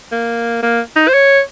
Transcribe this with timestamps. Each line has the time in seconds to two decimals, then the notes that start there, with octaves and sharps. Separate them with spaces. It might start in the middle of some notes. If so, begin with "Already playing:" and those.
0.12 A#3
0.63 A#3
0.96 D#4
1.08 C5
1.14 C#5